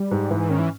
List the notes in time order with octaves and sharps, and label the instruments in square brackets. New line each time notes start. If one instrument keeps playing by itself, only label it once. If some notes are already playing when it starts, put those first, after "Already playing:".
Already playing: [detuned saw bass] G3
[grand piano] G#2
[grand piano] G#2 [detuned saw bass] E3
[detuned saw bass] D#3 [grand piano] C#4
[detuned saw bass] E3